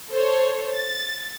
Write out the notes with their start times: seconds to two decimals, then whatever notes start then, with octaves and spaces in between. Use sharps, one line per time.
0.12 A4 C5 C#5
0.74 A6